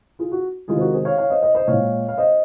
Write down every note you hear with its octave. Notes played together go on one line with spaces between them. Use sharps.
F4 G#4
F#4
C3 D#3 G#3 F4 G#4
C5
F#4 A#4
G#4 C5
C#5 F5
C#5 F5
C5 D#5
C5 D#5
C5 D#5
A#2 G#3 C#5 F5
F5
C5 D#5